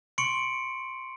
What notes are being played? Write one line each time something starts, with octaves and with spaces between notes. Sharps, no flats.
C6 C#6 C#7 D7 F#7